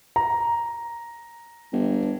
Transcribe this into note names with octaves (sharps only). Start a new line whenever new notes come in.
A#5
G1